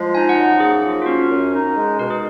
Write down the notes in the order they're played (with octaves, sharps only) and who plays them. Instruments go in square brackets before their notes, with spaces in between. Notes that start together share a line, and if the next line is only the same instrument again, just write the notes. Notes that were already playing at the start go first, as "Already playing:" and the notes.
Already playing: [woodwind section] F3 G#3
[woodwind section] D#4 [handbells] G#5
[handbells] F#5
[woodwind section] F#2
[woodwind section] A#3 [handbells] G#4
[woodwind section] F3
[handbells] F4
[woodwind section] C#4 [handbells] F#4
[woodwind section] F#2
D#4
G#3
[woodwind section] B2 [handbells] A#4
[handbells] G#4